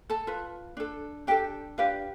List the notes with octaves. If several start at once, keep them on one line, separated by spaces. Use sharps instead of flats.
A4 A5
F4 B4
D4 A4
D4 G4 A4 G5
D4 F4 G4 B4 F5